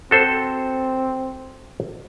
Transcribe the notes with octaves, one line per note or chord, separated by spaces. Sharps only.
C4 F#4 A4 C5